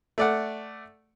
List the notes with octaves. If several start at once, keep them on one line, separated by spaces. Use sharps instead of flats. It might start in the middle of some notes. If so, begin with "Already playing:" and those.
A3 D5 F#5